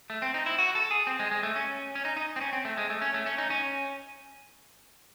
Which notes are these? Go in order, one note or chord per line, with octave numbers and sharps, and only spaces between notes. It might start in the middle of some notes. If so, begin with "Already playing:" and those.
A3
C4
D#4
E4
F#4
A4
G#4
C4
G#3
G#3
A3
C#4
C#4
D#4
D#4
C4
C#4
C4
A3
G#3
A3
C#4
A3
C#4
D#4
C#4